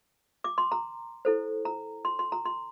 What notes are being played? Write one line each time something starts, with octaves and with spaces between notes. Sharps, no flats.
D6
C6
A#5
E4 A4 C5
A#5
C6
C6
A#5
C6